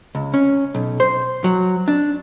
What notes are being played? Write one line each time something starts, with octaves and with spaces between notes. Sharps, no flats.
C#2
C#4
B1
C5
F#3
D4